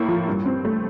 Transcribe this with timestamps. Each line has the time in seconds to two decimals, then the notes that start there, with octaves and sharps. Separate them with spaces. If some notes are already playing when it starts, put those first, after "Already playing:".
Already playing: A2 A#3 E4
0.08 F3
0.28 G2
0.46 C4
0.65 A3